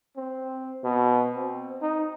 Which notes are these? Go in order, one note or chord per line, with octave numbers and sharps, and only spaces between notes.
C4
B2
C4
D#4